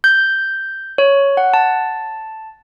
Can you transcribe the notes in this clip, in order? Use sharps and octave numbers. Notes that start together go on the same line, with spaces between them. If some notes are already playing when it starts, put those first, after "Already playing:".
G6
C#5
F#5
A5